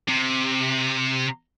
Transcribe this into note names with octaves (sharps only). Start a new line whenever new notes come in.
C3